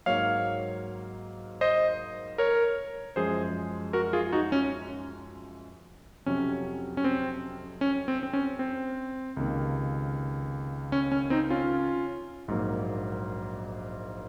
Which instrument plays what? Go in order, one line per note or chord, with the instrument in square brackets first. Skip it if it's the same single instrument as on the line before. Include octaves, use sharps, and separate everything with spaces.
[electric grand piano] G#2 F#3 A#3 C#5 F5
C5 D#5
A#4 C#5
F#2 F3 G#3 G#4 C5
F#4 A#4
F4 G#4
D#4 F#4
C#4
F2 C3 F#3 C#4
C#4
C4
C#4
C4
C4
C#4
C4
C#2 C3 D#3 A#3
C#4
C#4
C4 D#4
C#4 F4
A#1 G#2 F#3 A#3